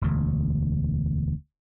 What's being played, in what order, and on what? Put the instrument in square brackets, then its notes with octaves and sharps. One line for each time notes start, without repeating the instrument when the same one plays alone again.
[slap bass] E1 D2